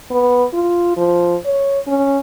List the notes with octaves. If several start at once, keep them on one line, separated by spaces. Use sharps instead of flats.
B3
F4
F3
C#5
C#4